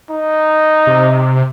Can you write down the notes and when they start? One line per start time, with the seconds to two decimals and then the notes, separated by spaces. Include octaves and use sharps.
0.10 D#4
0.87 C3